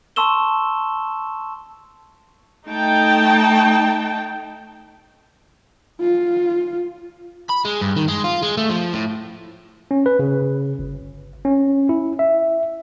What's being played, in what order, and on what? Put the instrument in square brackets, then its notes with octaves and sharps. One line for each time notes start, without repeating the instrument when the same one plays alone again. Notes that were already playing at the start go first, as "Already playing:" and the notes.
[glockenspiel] A5 C6 C#6 E6 E7 G7
[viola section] A3 D#4 G5 A5
[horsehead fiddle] F4
[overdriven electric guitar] B5
G#3
G2
D#3
G#3
F4
G#3
A3
F3
A2
[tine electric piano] C#4
B4
C#3
G1
C#4
E4
E5